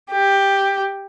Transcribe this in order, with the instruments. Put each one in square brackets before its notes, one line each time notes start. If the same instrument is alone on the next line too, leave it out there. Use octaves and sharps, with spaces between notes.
[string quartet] G4